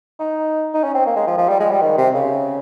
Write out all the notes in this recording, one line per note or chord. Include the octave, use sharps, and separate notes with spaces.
D#4
D#4
C#4
C4
A#3
G#3
F3
F3
G3
G#3
G3
D#3
C3
C#3